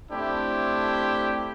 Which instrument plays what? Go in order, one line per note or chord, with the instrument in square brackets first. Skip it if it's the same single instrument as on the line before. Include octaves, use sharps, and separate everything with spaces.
[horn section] A3 C4 D4 E4 G4